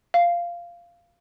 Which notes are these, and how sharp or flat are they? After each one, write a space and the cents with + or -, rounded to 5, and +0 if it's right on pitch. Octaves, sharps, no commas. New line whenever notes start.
F5 -10